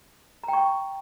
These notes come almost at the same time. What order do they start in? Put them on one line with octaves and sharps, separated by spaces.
A#5 G5 C#6